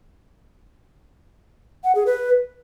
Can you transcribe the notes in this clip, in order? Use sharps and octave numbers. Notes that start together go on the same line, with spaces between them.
F#5
G#4
B4